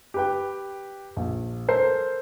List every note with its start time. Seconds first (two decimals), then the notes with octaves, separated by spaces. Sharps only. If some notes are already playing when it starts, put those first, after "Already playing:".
0.14 G4 B4 G5
1.16 A#1
1.68 A4 A#4 C5 C7